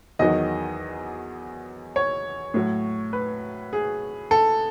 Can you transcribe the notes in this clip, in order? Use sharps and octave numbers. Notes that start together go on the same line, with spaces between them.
E2 D#3 F#3 D#5
C#5
A2 F#3
B4
G#4
A4